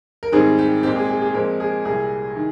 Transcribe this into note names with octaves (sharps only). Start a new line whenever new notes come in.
A#4
G#2 D#3 G3 C4 G#4
G4
A#2 G#3 C4 G4
G#4
G#4
G#4
A#2 F3 G#3 C4 A#4
G#4
C2 A#2 G3 G#4
D#3